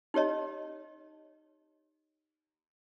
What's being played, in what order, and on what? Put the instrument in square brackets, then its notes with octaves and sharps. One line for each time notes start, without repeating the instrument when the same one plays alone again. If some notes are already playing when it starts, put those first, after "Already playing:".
[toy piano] D#4 G4 C#5 D#5